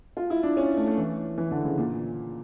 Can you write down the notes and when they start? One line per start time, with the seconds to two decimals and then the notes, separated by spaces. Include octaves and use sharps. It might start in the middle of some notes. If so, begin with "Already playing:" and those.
0.17 F4
0.30 E4
0.43 D4
0.57 C#4
0.77 A3
0.87 A3
0.97 E3
1.38 E3
1.51 D3
1.64 C#3
1.78 A#2